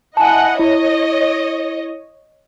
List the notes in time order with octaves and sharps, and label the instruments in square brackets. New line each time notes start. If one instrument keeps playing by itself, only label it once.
[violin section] E4 D#5 F#5 [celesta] G#5 A5
[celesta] E4 [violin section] C#5 D#5